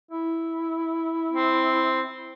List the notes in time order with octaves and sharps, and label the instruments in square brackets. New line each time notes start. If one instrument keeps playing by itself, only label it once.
[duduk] E4
[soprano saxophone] C4